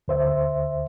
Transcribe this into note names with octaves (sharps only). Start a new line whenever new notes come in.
D2 C5 E5